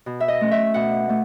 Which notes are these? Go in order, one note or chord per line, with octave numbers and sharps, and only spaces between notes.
B2
E5
D#5
A3 C#4
E5
B2 F#5
A3